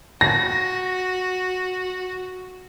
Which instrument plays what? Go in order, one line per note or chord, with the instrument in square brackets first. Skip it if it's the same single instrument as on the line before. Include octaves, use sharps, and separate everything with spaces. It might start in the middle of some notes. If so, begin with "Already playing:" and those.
[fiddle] F#4 [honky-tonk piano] A#6